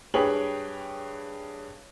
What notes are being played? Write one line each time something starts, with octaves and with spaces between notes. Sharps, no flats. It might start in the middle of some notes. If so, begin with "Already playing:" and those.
G2 G#4 B4 C#5 G5 F#7